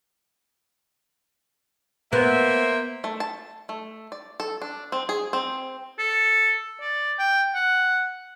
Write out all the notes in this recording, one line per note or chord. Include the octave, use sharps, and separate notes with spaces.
A#3 B3 C5 E5
A3
A5
A3
D5
A4
D4
C4
G#4
C4
A4
D5
G5
F#5